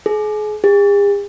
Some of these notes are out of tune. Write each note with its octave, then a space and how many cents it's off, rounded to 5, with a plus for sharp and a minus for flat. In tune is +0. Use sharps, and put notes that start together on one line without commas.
G#4 +35
G#4 -45